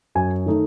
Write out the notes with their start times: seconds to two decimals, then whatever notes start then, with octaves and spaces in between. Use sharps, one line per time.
0.15 F#2 G#5
0.46 D#3 A3 D#4